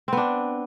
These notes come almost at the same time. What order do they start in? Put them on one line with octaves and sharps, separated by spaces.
C4 B3 D4